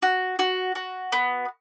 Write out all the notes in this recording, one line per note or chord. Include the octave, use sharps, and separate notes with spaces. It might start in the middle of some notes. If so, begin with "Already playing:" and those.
F#4
F#4
F#4
B3